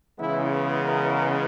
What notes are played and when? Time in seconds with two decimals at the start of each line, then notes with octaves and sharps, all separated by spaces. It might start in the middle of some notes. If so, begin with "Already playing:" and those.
0.20 C#3 E3 G#3 B3 E4
0.86 A#4